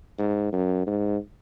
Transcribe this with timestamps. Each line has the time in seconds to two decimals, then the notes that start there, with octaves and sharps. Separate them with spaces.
0.19 G#2
0.52 F#2
0.87 G#2